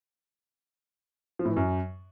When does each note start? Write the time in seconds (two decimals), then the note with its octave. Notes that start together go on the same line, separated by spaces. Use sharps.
1.39 F3
1.45 A2
1.51 E3
1.56 F#2